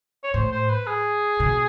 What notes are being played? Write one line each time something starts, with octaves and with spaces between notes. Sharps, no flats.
C#5
A2 C5
C5
B4
G#4
B2